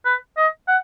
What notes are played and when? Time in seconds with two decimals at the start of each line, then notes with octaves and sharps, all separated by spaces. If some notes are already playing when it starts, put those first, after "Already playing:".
0.05 B4
0.37 D#5
0.68 F#5